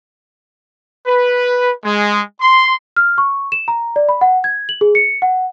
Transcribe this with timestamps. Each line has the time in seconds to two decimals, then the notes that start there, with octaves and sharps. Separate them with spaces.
1.07 B4
1.84 G#3
2.40 C6
2.96 F6
3.18 C#6
3.52 E7
3.68 A#5
3.96 D5
4.09 B5
4.21 F#5
4.44 G#6
4.69 F#7
4.81 G#4
4.95 C#7
5.22 F#5